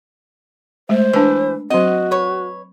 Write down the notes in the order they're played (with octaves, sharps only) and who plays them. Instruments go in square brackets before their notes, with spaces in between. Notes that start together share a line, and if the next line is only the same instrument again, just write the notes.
[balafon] G#3 A3 [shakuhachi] C5
[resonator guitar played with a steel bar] E3 [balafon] D4 B4
[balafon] F#3 C4 [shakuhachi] F#4 [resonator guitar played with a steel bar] D#5
[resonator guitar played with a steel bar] B4 C#5